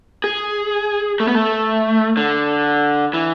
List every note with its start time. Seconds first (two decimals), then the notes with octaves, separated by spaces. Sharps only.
0.24 G#4
1.20 A3
1.28 B3
1.35 A3
2.17 D3
3.13 E3